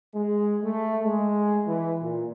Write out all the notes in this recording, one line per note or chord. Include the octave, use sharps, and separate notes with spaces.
G#3
A3
G#3
E3
A#2